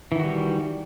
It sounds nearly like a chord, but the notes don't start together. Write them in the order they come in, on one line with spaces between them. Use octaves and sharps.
E3 D#3 F#4 G3